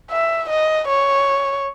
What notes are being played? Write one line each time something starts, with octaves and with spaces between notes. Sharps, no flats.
E5
D#5
C#5